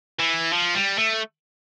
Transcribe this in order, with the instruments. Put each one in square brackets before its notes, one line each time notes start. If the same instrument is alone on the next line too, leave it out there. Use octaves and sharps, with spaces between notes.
[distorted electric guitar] E3
F3
G3
A3